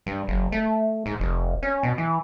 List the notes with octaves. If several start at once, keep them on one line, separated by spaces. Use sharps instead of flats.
G2
F#1
A3
G#2
F1
C#4
B2
E3